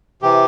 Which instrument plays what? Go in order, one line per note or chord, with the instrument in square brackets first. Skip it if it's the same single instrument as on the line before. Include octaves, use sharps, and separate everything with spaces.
[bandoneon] C3 E3 G4